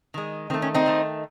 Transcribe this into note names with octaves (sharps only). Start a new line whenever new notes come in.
D#3 G#3
D#3 A3 C4
C#4
C4 D#4
D#3 A3